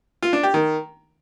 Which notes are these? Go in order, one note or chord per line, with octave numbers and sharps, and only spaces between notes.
F4
D4
G4
D#3